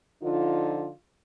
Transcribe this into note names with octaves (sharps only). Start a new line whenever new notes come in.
D3 F3 D#4 F4